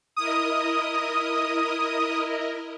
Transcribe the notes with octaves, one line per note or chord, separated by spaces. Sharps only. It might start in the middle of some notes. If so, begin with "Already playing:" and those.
E4 A#4 D#5 D#6